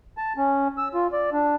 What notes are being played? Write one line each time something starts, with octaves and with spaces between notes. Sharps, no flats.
A5
C#4
E6
F4
D5
D4